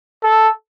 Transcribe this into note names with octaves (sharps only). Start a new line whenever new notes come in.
A4